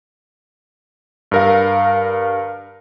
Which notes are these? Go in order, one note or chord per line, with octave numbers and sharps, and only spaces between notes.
G2 A#4 F5